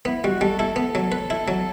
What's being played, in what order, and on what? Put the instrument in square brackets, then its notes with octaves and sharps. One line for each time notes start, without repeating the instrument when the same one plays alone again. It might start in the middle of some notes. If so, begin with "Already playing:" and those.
[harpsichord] B3 [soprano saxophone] E4
[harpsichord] G3 [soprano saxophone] F#4
[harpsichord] G3 [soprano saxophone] A4
[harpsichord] E4 [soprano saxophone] A4
[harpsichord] B3 [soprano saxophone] A4
[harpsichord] F#3
B4
E4
F#3